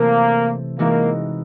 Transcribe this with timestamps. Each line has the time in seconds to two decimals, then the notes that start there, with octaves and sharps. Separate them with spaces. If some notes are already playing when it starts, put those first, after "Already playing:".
Already playing: C3 E3 A3 A#3 C4
0.79 E3 G#3 A#3 C4 D#4 F#4